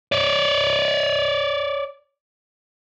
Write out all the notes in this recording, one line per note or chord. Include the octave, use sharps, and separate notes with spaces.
C#5 D5